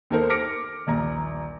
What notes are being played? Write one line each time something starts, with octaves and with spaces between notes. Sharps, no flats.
D#2 D#4 A4 A#4 C5
D6 F6 A#6 C#7 D7
D#1 A#1 A#5